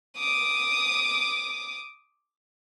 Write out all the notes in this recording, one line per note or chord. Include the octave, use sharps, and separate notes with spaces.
D6 D#6